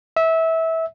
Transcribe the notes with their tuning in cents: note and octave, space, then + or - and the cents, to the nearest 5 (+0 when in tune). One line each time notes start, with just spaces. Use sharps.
E5 -20